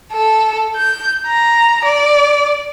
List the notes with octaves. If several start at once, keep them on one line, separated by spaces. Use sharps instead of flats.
A4
G6
A#5
D5